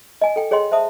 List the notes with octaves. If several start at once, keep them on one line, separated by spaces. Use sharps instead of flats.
D#5 G#5
A4 G5
G#4 C#5 D#5 G5 C6
C5 E5 A5 D#6